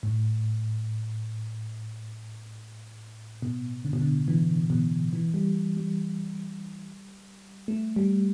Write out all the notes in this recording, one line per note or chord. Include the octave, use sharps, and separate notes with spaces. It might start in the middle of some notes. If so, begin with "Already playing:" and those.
A2
B2
D3
B2
D3
E3
B2
E3
G3
G3
A3
G3